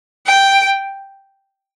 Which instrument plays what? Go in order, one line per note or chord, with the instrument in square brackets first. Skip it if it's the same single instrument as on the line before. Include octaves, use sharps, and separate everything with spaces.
[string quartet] G5